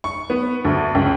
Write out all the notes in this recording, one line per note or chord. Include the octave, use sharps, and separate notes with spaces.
C#6
B3
D2
C#2